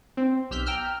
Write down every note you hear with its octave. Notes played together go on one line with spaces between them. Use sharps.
C4
B1 G4 E6 F6 G6 B6
G5 A#5 E6 F6 G6